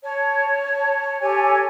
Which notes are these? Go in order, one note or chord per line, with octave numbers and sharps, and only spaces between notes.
C#5 A5
G4 A4 C#5 G#5